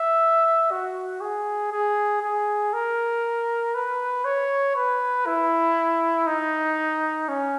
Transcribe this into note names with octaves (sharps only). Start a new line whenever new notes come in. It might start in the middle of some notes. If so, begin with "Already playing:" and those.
Already playing: E5
F#4
G#4
G#4
G#4
A#4
B4
C#5
B4
E4
D#4
C#4